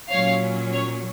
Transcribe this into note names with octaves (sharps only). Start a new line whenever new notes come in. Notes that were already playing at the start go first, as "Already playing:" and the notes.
A#2 F#3 C#4 C#5 F5
C#5